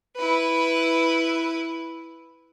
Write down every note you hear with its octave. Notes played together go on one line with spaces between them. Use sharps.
E4 B4